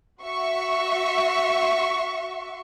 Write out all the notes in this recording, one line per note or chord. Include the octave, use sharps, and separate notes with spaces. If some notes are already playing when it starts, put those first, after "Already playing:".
F#4 E5 C#6